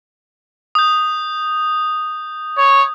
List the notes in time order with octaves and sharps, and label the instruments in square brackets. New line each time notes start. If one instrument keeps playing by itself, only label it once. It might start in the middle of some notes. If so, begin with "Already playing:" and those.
[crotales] D#6 G6
[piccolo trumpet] C#5